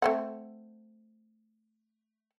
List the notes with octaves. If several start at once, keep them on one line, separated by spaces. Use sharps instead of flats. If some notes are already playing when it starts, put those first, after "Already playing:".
A3 C4 F#5